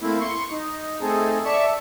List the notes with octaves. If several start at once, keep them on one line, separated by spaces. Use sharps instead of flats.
A3 A#3 C4 E4
C6 C#6
D#4
A3 C4 D#4 G#4 A4
D5 E5 A5 C#6